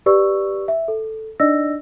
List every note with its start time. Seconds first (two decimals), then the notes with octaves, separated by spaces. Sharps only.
0.06 G4 B4 D5 C#6 E6
0.68 E5
0.88 A4
1.40 D4 D#4 D5 D#5 E6 A#6